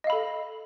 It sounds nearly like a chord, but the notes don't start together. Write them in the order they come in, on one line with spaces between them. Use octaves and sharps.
D#5 F5 B5 A4